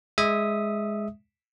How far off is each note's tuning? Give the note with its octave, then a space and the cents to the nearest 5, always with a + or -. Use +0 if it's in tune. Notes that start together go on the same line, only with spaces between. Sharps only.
G#3 +0 E5 -10 D#6 +0